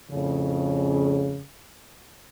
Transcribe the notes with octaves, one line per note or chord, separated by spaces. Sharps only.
F2 A2 C#3